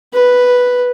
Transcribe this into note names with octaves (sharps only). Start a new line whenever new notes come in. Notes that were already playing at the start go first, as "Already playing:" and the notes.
B4